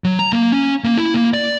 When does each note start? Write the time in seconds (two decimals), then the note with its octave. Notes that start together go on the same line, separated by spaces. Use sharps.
0.04 F#3
0.19 A#5
0.33 A#3
0.52 C#4
0.84 A#3
0.98 E4
1.14 A#3
1.33 D5